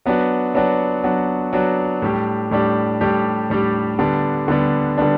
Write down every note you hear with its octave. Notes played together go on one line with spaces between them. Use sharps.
F#3 B3 D4 F#4
F#3 B3 D4 F#4
F#3 B3 D4 F#4
F#3 B3 D4 F#4
A2 G3 D4 G4
A2 G3 D4 G4
A2 G3 D4 G4
A2 G3 D4 G4
D3 G3 B3 D4
D3 G3 B3 D4
D3 G3 B3 D4